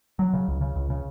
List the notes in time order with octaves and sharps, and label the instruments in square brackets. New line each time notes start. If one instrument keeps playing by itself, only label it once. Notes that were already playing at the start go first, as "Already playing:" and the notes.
[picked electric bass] F#3
C#3
C#2
C#3
C#2
C#3